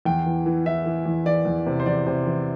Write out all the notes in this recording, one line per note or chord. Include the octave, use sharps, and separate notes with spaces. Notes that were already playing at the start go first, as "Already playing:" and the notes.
E2 G5
E3
E3
E3 E5
E3
E2
E3 D5
E2
C3
C5
E2 D5
C3
E3